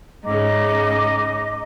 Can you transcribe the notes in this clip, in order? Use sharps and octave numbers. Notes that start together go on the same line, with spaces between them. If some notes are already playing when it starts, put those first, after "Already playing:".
G#2 C#3 D#5 A#5 D6